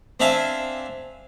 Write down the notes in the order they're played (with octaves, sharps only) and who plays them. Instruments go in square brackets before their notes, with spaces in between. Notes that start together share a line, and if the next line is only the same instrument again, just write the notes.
[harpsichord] C4 D4 E5 F5 G#5